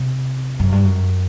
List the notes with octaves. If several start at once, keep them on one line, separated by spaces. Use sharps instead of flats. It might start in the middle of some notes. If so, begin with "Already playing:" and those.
Already playing: C3
F#2
G2
F#2